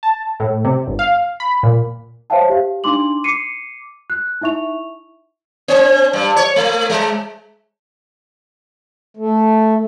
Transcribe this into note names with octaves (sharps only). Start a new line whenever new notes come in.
A5
A2
C3
G1
F5
B5
A#2
C5 C#5 E5 F5 G5 A5
G4 F5
D4 D#4 C6 D6 F#7
D6 C7 C#7 D#7
F#6
D#4 E4 E5 C#6 F7
C4
G2
C#5
A3
G#3
A3